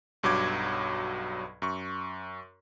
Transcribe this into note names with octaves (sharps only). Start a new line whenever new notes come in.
B1 G2 F#3 D6 G#6
F#2 C#6